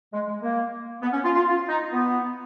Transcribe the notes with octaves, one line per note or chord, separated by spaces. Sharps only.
G#3
G#3
A#3
B3
C#4
F4
F4
F4
D#4
B3